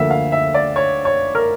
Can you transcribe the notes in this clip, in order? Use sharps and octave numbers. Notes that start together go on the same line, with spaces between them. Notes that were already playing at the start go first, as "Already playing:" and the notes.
Already playing: D2 D3 F3 A#3 E5
F5
E5
D5
C#5
C#5
A#4